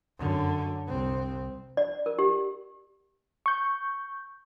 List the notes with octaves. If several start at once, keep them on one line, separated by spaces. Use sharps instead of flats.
F#2 D3
C2 C4
D5
A#4
G4
C#6 G6